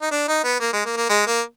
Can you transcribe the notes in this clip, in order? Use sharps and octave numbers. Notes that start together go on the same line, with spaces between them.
D#4
D4
D#4
B3
A#3
G#3
A#3
A#3
G#3
A#3